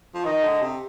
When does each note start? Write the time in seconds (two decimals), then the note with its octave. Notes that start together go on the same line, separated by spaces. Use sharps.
0.15 F3
0.25 D#3 D#5
0.44 D3
0.62 C3